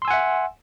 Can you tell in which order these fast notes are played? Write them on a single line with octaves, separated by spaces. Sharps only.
C6 E6 G#5 F#5 E5